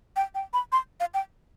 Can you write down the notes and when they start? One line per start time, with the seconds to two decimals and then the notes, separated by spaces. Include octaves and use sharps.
0.16 G5
0.35 G5
0.53 B5
0.72 C6
1.00 F5
1.14 G5